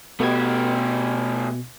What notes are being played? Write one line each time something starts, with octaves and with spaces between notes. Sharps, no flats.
B2 A3 G4 G#6